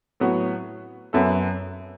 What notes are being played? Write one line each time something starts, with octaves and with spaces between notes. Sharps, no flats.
A2 F#3 B3 F#4
F#2 F#3 B3 A4 E5